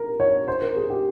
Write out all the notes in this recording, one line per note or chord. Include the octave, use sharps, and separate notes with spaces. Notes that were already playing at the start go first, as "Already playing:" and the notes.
Already playing: A#4
C#5
C5
A#4
G#4
G4